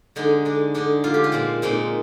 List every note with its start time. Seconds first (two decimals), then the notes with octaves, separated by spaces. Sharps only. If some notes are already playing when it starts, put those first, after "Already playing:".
0.16 D3 G#3 D4 D#4
0.45 D3 G#3 D4
0.74 D3 G#3 D4 D#4
1.04 D3 G#3 D4 F4
1.14 G4
1.24 F4
1.32 A#2 G#3 C4
1.62 A#2 G#3 C4 D#4